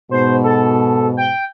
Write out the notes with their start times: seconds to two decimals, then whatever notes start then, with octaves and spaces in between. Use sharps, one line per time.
0.11 G#2 B2 C5
0.44 A4
1.17 G5